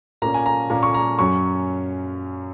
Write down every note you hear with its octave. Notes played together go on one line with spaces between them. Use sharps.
A#2 A#3 C#4 A#5
G#5
A#5
A#2 A#3 C#4 A#5
C#6
A#5
F#2 F#3 C#4 C#6